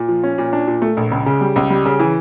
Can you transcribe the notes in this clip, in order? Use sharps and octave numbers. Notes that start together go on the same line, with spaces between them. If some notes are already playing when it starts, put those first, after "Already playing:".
Already playing: A#2
F3
C#4
A#2
D4
A#2
A3
A#1
C#2
C#3
G3
C#2
G3
C#3
E3